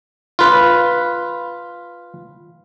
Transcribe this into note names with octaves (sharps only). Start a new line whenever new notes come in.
F4 B4